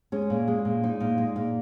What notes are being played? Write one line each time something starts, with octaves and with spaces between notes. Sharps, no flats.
G#3 C#4
A#2
G#3
A#2
G#3 D#4
A#2
G#3
A#2